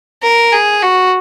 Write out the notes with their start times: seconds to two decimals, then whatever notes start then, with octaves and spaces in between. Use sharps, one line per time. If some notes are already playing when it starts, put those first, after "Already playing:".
0.23 A#4
0.53 G#4
0.83 F#4